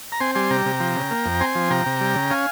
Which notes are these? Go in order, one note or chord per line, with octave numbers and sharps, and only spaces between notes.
A#5
C4 G#5 C6
G3 G#5 C6
C3 G5 A#5
C3
F3
C#3
A#3
F2
C4 G#5 C6
F3
C3 G5 A#5
C3
G3
C#3
C#4 F5 G#5